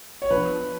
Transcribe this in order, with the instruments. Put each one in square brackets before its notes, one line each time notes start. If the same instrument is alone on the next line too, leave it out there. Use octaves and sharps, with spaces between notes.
[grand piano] C#5
[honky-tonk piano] F3 B3 D4 [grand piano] B4